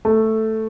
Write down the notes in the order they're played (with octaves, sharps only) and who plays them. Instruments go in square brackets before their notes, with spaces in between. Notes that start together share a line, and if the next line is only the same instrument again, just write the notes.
[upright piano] A3